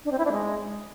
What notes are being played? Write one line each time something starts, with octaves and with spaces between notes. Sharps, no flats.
D4
C4
E4
D4
G#3